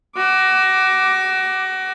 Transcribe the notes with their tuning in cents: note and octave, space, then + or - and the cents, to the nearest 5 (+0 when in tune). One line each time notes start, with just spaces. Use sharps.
F#4 +25 D6 +0